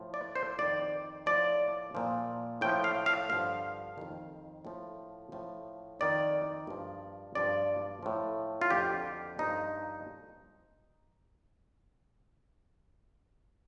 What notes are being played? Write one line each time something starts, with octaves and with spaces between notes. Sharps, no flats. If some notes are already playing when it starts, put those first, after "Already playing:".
Already playing: A2 F3
D5
C5
F2 D#3 D5
A2 F3 D5
A#2 F3
A2 F3 G5
F5
F5
G2 D3 F3 F5
F2 D#3
A2 F3
A2 F3
F2 D#3 D5
G2 F3
G2 F3 D5
A2 F3
F4
F2 D3 F3 G4
G2 F3 D#4